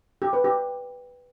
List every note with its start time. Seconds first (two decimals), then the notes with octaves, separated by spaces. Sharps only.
0.22 G4
0.33 B4
0.44 G4